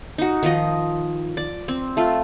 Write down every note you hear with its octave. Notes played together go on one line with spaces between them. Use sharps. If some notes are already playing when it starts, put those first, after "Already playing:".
D#4 F#4
D#3 F3 D#5
D5
C4
A3 F4